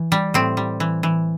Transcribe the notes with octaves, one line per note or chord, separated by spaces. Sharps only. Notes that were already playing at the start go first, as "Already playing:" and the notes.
Already playing: E3
G3
A2 C4
G3
E3
E3